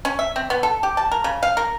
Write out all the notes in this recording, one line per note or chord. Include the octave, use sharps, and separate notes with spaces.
C#4
E5
C4
B3
A4
G4
A5
A#4
C#3
F5
A#4